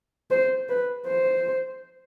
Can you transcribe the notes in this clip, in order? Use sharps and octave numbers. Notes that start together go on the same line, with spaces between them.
C5
B4
C5